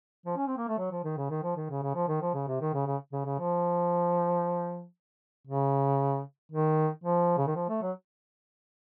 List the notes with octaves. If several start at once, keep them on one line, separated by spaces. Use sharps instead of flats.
F3
C#4
C4
A#3
A3
F#3
F3
D#3
C#3
D#3
F3
D#3
C#3
C#3
F3
D#3
F3
C#3
C3
D#3
C#3
C#3
C#3
C#3
F3
C#3
D#3
F3
C#3
D#3
F3
A3
F#3